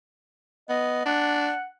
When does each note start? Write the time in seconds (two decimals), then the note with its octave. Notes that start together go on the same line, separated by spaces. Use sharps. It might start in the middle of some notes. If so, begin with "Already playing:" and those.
0.69 B3 D#5
1.06 D4 F#5